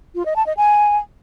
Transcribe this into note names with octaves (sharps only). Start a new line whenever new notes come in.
F4
D#5
A5
D#5
G#5